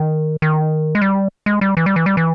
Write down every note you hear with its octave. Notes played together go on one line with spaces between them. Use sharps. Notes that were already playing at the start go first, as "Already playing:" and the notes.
Already playing: D#3
D#3
G#3
G3
G#3
G3
E3
G3
E3
G3
E3